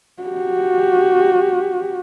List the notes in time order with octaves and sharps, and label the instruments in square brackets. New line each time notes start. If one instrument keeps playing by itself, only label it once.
[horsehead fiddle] F#4 G4